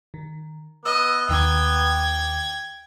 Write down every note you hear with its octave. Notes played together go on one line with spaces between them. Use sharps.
D#3
B3 D#5 E6
D#2 D#3 G5 D6 G#6